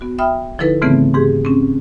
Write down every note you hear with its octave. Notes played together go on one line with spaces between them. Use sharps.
B3 F#4
E5 G5 B5 D#6 F6
D3 F3 D#4 E4 A4 B4
G#2 C#3 E3 A3 B3 C4
G#2 G4 G#4
C4 C#4